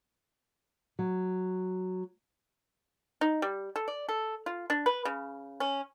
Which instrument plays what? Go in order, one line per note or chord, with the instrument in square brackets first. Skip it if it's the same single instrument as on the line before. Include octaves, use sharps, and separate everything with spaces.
[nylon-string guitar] F#3
[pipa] D#4
G3
A4
D5
A4
F4
D4
B4
C#3
C#4